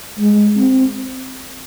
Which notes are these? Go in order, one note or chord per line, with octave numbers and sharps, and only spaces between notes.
G#3
C4